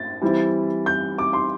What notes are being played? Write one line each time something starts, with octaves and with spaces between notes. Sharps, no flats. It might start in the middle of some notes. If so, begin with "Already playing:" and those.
Already playing: A6
E3 G3 C4 E4
G6
D6
C6